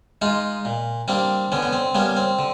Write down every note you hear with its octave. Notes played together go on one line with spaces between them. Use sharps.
G#3 D#4 F4
A#2
G3 A#3 C4 D4
D3 B3 C#4
B3
C4
G3 A#3 B3 C#4
C4
D3